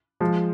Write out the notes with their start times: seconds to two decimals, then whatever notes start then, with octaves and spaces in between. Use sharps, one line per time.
0.20 F3 G#3